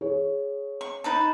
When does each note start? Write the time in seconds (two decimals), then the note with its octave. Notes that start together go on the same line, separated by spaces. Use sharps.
0.01 G#4 C#5
0.81 C#6
1.04 D#4 B4 A5